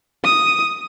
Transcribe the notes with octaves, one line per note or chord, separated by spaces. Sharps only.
D#6